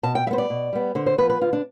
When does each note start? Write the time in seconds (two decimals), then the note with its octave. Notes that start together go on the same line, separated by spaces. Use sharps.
0.03 B2 A5
0.15 G5
0.27 G3 E5
0.31 B3 C5
0.38 D5
0.50 B2
0.73 G3 B3
0.95 D3 C5
1.06 C5
1.18 F3 B3 B4
1.30 B4
1.41 D3 F4
1.53 D4